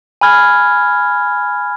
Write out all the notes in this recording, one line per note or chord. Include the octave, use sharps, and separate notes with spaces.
G#5 B5 F6 G#6